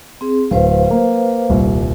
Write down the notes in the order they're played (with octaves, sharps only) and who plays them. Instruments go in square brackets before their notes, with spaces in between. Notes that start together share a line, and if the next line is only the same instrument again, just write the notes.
[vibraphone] C4 G#4
[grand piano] D1 [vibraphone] B4 C5 F5
[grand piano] A#3
D#1 C2 A#2